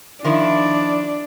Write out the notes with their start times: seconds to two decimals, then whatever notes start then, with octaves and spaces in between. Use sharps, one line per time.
0.24 D#3 F3 D4 E4